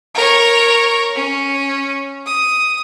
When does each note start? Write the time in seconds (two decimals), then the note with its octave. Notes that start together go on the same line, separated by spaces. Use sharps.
0.14 A#4 C#5
1.15 C#4
2.26 D#6